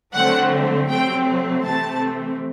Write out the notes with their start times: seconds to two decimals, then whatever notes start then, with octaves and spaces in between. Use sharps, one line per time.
0.14 D3 F#3 A3 C4 F#5
0.89 C3 F#3 A3 C4 G5
1.65 C3 E3 A3 C4 A5